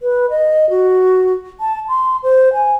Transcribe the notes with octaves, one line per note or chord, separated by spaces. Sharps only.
B4
D#5
F#4
A5
C6
C5
G#5